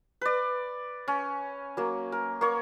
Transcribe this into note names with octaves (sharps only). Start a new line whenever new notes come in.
B4 D5
C#4
F#3 A#3
A#4
A#3 C#5